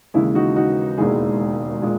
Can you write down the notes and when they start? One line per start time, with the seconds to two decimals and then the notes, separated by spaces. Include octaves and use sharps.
0.14 D#2 C#3 E3 G#3 E4
0.35 D#4 F#4
0.56 D#4 F#4
0.98 E1 D#2 D#3 G#3 E4 G#4
1.82 A#2 G#3